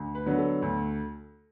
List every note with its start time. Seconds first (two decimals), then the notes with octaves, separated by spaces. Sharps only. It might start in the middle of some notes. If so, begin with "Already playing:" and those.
Already playing: D2
0.15 B4
0.26 D3 F#3 B3
0.38 A4
0.62 D2